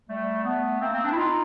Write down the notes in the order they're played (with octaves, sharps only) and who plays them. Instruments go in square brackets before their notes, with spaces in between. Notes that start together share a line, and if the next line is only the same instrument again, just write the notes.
[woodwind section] G3 A3
A3 B3
A#3 C4
A#3 C4
C4 D4
E4
D#4 F4